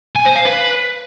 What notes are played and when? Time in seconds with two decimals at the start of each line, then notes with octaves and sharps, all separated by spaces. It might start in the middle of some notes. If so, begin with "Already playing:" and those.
0.16 G#5
0.26 C5
0.36 F5
0.45 B4